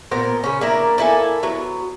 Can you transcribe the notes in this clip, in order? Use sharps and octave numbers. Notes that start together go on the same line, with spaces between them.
A#2 B3 A#4 C5
C#3 C#4
A#3 D4 E4 A#4
A#3 E4 A4 G#5
F#3 B3